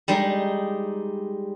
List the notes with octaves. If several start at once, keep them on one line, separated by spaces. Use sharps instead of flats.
G3 G#3 D#4